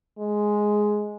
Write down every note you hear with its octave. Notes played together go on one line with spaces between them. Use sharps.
G#3